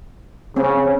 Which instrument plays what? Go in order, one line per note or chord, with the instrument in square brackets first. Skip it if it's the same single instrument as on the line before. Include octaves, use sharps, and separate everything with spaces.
[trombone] C#3 [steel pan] C4 C#4